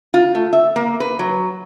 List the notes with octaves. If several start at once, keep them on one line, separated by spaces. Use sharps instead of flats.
F4
A3
E5
A#3
B4
F#3